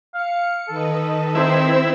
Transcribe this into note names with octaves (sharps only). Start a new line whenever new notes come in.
F5 C#7
D#3 A4 B4 D#5
C4 E4 C5